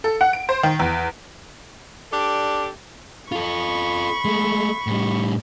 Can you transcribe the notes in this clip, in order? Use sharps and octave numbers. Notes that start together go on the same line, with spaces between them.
A4
F#5
D7
C5
D#3
E2
D4 G4 A4 D5
F4 A4 B5 C#6
G#3 A3
A2 G3